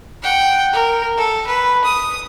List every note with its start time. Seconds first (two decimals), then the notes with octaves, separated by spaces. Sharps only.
0.23 F#5 G5
0.73 A#4
1.17 A4
1.47 B4
1.85 D#6